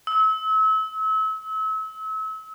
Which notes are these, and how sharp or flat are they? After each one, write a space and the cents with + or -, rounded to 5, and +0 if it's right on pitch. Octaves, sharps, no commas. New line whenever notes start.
E6 -35